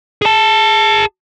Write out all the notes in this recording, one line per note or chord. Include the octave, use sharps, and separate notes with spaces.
G#4 A5